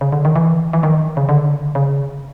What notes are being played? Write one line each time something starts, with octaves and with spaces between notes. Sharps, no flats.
C#3
D3
D#3
E3
E3
D#3
C#3
D3
C#3